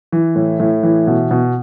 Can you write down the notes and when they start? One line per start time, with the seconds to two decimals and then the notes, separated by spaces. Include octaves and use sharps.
0.12 E3
0.36 A2
0.60 A2
0.83 E3
1.07 B2
1.31 B2